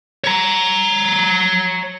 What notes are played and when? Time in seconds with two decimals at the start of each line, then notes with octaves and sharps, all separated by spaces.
0.24 C#5 A#5